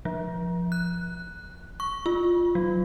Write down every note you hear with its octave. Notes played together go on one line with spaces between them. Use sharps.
F3
F#6
C#6
F4
F#3